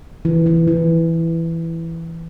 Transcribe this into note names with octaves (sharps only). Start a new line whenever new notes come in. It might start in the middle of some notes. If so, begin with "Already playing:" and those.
E3
E3
E3